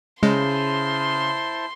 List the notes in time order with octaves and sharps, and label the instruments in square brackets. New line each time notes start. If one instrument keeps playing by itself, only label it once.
[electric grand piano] C#3 [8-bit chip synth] G#3 [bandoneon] E4 C5 A5 [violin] C6